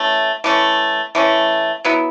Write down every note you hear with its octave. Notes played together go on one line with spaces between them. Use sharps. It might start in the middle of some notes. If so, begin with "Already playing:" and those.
Already playing: E3 A3 C#4
E3 A3 C#4
E3 A3 C#4
F#3 B3 E4